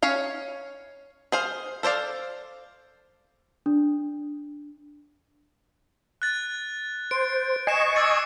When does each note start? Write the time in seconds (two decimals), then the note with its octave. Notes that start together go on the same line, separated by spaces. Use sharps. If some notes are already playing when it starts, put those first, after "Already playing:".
0.03 C#4 C#5 F5
1.32 G#4 C5 F5
1.83 A4 C5 D5 F5
3.66 D4
6.22 F#6 A6
7.11 C5 D7
7.67 D#5 G#5 C#6 C7 E7
7.96 D6 E6 A6